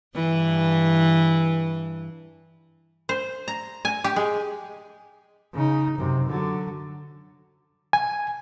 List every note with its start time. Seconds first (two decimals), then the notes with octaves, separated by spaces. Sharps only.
0.15 G2 E3
3.09 C5
3.48 A#5
3.85 G#5
4.04 G4
4.16 G#3
5.53 C#3 D#4
5.98 F#2 C3
6.29 D3 F#3
7.93 G#5